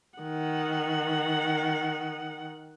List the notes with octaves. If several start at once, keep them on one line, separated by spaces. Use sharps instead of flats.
D#3 F#5